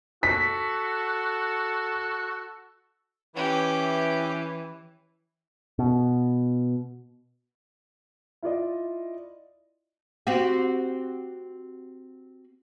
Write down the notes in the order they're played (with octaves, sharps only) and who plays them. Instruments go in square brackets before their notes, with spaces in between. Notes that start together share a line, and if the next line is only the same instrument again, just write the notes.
[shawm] F#4 [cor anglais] A4 [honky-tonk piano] B6
[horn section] E3 [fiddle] C#4 G4
[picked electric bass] B2
[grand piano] E4 F4 D5 D#5
[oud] C4 F#4 G4